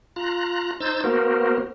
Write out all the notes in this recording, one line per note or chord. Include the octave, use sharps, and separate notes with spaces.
F4 A#5 F#6
D#4 C5 E6 G6 A6
A#3 B3 F#4 A#4 C5